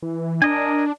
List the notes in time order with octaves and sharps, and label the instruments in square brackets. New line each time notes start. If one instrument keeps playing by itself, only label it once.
[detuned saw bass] E3
[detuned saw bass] D4 [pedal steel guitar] A#4 D#5 G#5